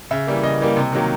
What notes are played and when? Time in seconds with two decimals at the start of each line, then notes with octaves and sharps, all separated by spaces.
0.11 C#3 E5
0.27 E3 G3 A#3
0.43 C#3 D#5
0.60 E3 G3 A#3
0.76 C3
0.93 D#3 F#3 A#3